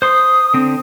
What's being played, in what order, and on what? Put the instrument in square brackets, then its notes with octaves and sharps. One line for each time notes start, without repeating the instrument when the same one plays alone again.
[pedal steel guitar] C5 C6 [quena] D#6
[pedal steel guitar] D3 C4